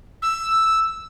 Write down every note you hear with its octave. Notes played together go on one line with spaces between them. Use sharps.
E6